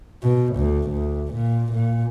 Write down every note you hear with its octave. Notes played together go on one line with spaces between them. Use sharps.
B2
D2
D2
A#2
A#2